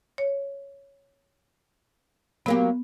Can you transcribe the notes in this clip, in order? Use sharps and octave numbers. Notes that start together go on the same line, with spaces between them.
C#5
F#3 A#3 B3 G4